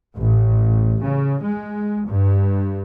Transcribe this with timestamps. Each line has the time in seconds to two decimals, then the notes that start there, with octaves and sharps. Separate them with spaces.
0.16 A1
1.02 C#3
1.42 G#3
2.06 G2